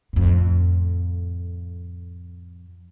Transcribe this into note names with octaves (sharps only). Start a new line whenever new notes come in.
F2 A2